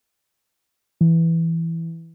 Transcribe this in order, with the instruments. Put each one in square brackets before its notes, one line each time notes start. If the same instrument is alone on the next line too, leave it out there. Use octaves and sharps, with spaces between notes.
[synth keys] E3